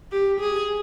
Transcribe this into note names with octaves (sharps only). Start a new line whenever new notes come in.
G4
G#4